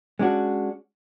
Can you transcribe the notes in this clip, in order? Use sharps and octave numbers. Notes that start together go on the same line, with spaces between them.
G#3 C#4 D4 F#4